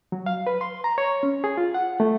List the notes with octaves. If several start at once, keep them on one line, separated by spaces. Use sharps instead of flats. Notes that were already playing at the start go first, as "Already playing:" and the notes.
F#3
F5
B4
C6
A#5
C#5
C#4
G#4
F4
F#5
A3